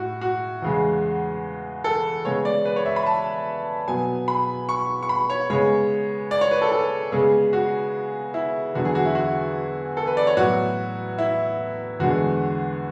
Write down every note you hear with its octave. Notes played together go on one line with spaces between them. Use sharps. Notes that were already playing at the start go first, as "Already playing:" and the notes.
Already playing: A2 F#4
F#4
E2 C#3 G#3
A4
C#3 G#3 B3 C#5
D5
B4
C#5
E5
B5
A5
B2 F#3 B3 G#5
B5
C#6
C#6
B5
C#5
C#3 G#3 B3 C#5
D5
C#5
B4
A4
A4
C#3 G#3 B3 G#4
F#4
E4
E2 D3 F#3 B3 F#4
G#4
F#4
E4
F#4
A4
B4
D5
C#5
A2 F#3 B3 F#4
E4
E2 D3 G#3 B3 F#4